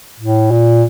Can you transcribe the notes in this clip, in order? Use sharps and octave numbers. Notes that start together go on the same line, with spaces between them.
A2
A#2